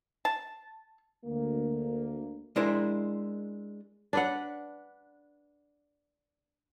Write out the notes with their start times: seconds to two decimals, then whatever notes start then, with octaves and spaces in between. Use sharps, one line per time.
0.25 A5
1.25 D2 A#3
2.56 G#3 D4 E4 A#4 C5
4.13 D4 B4 F#5